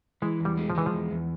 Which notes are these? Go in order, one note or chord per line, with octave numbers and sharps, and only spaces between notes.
E3 G#3
E2
G3
G#3
F3
E3 G#3
F3
E2
E2